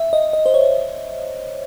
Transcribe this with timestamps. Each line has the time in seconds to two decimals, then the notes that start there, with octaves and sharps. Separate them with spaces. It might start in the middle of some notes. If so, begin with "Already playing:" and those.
Already playing: E5
0.13 D#5
0.33 D#5
0.46 C5
0.54 C#5